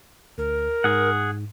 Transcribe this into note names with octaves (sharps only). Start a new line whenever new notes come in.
D2 A#4
G#2 G#4 F#5